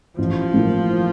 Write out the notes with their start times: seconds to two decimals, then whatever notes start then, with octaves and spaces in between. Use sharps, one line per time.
0.18 A1 F3
0.53 A2 E3 A#3